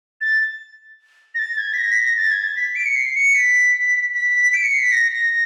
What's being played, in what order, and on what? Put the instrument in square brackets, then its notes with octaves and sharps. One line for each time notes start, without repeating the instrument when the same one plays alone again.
[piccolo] A6
A#6
A6
G#6
B6
A#6
B6
A#6
A6
G#6
A6
B6
D7
C#7
C7
C#7
B6
B6
D7
C#7
C7
B6
A#6
A#6